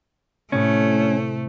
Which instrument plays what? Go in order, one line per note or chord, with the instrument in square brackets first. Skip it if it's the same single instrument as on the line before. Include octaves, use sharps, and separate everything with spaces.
[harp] A2 C3 [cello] A3 [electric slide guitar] C#4